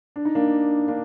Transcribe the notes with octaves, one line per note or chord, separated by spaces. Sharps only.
D4
D#4
A#3 D4
A#3 D4